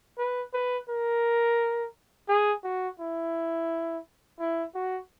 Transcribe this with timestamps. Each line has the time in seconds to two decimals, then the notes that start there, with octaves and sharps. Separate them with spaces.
0.19 B4
0.54 B4
0.89 A#4
2.29 G#4
2.64 F#4
3.00 E4
4.40 E4
4.75 F#4